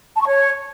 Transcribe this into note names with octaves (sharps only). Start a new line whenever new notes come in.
A5
C#6
C#5